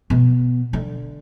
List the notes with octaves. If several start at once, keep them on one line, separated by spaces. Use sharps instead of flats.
B2
D3